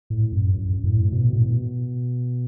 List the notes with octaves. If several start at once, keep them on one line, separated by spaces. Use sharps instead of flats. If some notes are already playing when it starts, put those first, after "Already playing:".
A2
F#2
F#2
F#2
A2
A2
B2
A2
B2